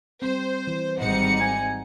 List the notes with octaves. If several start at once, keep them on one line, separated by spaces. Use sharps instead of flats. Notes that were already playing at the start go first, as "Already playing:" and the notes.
G3 C4 C5
E3
G#1 G3 C4 D#4 F#5 C#7
G#5